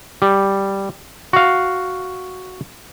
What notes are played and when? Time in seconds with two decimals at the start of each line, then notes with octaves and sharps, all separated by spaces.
0.22 G3
1.33 F#4 F5